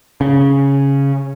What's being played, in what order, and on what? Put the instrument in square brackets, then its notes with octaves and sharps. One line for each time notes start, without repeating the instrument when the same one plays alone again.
[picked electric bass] C#3